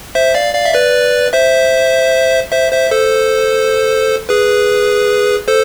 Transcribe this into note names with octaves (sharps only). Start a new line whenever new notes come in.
C5 E5
D5 F5
D5 F5
E5
B4 D5
C5 E5
C5 E5
C5 E5
A4 C5
G#4 B4
A4 C5